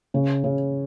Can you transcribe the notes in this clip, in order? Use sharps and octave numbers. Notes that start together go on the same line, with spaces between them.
C#3
C#3